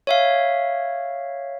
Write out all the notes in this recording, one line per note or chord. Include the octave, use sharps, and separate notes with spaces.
C#5 E5 F5